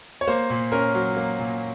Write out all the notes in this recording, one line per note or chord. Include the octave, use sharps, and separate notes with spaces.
C#5
A#3 C5
A#2
C#4 A#4
F#3
A#3
A#2